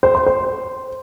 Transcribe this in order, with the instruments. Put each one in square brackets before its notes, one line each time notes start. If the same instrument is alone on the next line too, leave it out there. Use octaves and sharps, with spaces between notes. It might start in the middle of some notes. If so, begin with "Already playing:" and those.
[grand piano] C5
C6
C5